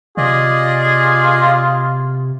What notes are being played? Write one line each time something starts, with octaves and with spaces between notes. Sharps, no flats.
C3 F4 G#4 D5 D#5